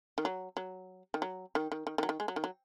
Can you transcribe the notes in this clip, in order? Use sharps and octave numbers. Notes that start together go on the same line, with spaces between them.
D#3
F#3
F#3
D#3
F#3
D#3
D#3
D#3
D#3
F#3
D#3
G#3
F#3
D#3
F#3